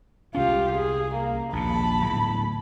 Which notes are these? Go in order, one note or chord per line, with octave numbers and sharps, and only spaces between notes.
C2 C#4 F4 G4
G#4
A#3
A#1 D#2 A#2 A5 B5
D1 E2